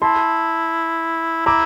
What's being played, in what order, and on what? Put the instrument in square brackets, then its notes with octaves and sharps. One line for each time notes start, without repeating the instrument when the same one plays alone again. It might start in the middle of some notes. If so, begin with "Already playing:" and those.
[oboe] E4 [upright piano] A5 C6
[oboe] E4 [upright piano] A#5 D6